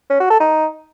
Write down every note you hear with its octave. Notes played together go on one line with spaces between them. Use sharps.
C#4
F#4
A4
D#4